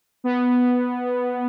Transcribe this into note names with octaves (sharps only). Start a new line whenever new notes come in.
B3